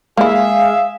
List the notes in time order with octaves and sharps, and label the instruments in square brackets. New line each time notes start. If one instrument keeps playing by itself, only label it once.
[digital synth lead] G#3 [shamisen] A#3 E4 [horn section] G#4 E5 [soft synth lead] F5